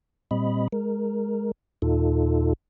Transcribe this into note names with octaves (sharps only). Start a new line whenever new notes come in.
A#2 G3 C4 D#5 B5
G#3 A#4
D#2 A#2 D#4 F4 A4